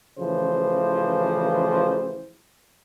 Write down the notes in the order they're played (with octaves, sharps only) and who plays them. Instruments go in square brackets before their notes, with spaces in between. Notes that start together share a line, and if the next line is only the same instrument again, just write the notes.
[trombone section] A1 C#3 E3 F3 C5